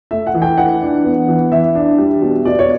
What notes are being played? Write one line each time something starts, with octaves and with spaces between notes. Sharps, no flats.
A3 E5
F#5
E3
G5
E3 F#5
D4
B3
E3
E3 E5
D4
G3
B2
B2 D5
C#5